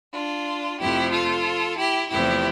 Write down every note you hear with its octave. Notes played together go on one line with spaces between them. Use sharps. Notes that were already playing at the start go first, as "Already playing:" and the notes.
D4 F4
F2 C3 F3 A3 E4 G4
F4 A4
E4 G4
E2 C3 F3 A3 E4 G4